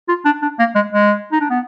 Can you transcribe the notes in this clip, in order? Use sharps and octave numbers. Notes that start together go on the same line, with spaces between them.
F4
D4
D4
A#3
G#3
G#3
D#4
D4
B3